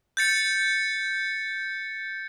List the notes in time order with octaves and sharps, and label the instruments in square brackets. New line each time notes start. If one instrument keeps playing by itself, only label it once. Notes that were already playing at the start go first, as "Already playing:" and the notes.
[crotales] G6 A6 C#7